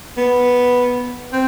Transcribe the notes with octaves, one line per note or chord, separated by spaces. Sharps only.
B3
C4